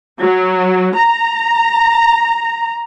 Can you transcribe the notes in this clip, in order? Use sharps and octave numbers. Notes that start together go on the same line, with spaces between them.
F#3
A#5